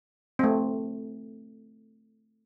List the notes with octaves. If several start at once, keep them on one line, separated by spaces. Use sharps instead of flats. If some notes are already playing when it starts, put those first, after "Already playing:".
A3 C4